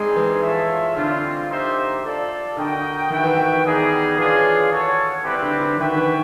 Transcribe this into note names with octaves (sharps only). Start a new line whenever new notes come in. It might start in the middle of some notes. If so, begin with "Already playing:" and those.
Already playing: G3 G#3 C4 D#4 G#4 C5
E3
F4 A4 C#5 E5
D3 G3 C4 F4
A#3 D#4 G4 C5 E5
F4 A4 D5
D3 F#4 A#4 D#5 G5
D#3 F#4 B4 E5 G5
E3
D#3
G3 B3 D#4 G#4
E3 D4 F4 G#4 C#5
F#4 A4 C#5
G3 C4 E4 G4 B4
D3
D3
D#3 F#4 B4 E5 G5
E3